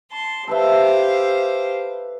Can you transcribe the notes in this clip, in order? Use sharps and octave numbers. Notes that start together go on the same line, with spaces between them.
A5 C6
G4 A4 B4 C5 E5 F5